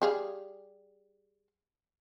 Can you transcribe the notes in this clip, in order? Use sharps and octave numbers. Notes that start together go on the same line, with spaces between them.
G3 G#4 F5